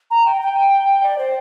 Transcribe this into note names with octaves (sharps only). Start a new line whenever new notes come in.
A#5
G5
G5
D5
C5